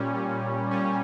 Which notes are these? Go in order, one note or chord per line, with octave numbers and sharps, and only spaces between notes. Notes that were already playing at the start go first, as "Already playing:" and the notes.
Already playing: A#2 G3 C#4
A#2
G3 C#4